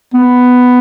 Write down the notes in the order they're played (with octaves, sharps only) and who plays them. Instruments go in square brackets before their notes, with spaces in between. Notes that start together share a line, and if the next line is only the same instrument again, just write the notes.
[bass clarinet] B3